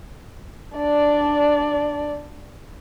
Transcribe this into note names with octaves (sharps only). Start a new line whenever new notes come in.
D4 D5